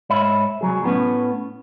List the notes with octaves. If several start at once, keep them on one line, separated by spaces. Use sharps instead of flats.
G#2 C#5 E5 B5
C2 F#3 G#4
A2 B3 C#4